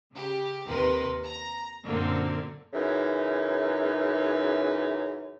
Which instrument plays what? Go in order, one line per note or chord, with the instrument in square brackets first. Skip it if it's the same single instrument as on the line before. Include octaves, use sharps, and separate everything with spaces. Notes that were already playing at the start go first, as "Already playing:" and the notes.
[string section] C#3 G4
D#2 C3 D#3 A#4 B4 C6
A#5
F#2 A#2 D3 A#3 C4
[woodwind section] F#2 C#3 E3 D#4